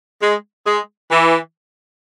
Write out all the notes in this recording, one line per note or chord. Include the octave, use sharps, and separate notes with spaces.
G#3
G#3
E3